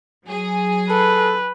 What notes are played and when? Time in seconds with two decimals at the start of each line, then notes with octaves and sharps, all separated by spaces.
0.25 F#3 G#4
0.90 A4 B4